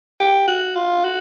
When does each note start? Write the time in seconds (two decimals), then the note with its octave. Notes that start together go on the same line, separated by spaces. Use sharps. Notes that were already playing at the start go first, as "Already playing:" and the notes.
0.20 G4
0.47 F#4
0.76 F4
1.04 F#4